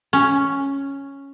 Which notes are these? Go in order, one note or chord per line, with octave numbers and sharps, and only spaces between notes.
C#4